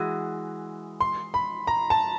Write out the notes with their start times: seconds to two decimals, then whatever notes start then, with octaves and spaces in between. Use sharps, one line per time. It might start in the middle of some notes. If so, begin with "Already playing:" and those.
Already playing: E3 G#3 F#4
1.01 C6
1.34 B5
1.67 A#5
1.90 A5